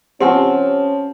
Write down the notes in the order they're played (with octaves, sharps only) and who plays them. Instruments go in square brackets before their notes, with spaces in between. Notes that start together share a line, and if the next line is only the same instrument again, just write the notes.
[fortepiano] F3 C4 [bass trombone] C#4 [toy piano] G4 F#5 G#5